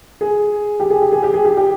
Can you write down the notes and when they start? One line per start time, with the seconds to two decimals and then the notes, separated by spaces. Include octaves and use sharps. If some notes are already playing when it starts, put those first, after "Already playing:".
0.21 G#4
0.80 G4
0.90 G#4
1.02 G4
1.12 G#4
1.23 G4
1.34 G#4
1.45 G4
1.57 G4